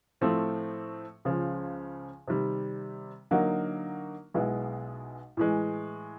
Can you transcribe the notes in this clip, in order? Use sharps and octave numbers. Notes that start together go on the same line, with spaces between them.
A2 F3 A3 C4
C#2 C#3 F3
C3 D#3 G3
D3 F#3 A#3 D#4 F#4
B1 B2 G#3 B3 E4
A2 E3 G#3